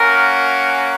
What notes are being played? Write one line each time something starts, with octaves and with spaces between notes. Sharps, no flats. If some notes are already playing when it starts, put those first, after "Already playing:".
Already playing: A#3 C#4 F#4 A#4